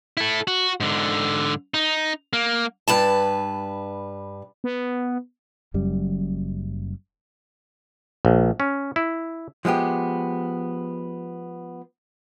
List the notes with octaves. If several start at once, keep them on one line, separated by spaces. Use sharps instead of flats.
E4 A4
F#4
G#2 D3
D#4
A#3
G2 B4 A5
B3
F#1 F#2 G3
A#1
C#4
E4
F3 G#3 B3 G4